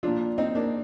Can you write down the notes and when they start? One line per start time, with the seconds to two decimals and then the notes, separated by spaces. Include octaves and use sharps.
0.03 A#2 F3 D4 F4
0.38 C4 D#4
0.55 A#3 D4